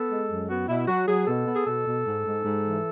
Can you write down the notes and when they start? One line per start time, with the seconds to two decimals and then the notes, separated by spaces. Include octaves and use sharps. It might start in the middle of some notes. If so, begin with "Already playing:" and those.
Already playing: B3 A4
0.09 G#3
0.29 F#2
0.48 B3 F#4
0.68 B2 E4
0.87 F#3 F#4
1.07 F#3 G#4
1.26 B2 A4
1.46 B3
1.55 G#4
1.66 B2 A4
1.86 B2
2.05 G#2
2.25 G#2
2.44 G#2
2.64 E3